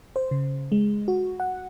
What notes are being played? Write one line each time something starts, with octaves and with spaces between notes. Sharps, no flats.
C5
C#3
G#3
F#4
F#5